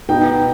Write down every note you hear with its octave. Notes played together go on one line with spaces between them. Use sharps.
B2 B3 D#4 G5